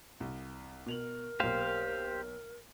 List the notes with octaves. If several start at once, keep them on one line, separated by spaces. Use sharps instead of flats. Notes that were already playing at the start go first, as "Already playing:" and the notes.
C2
B2 A#4 F7 F#7
B1 A#3 G4 C5 F5